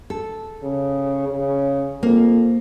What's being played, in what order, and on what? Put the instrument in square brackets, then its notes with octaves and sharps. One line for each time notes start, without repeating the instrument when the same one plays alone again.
[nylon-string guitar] A4
[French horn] C#3
C#3
[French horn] F2 [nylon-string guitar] A#3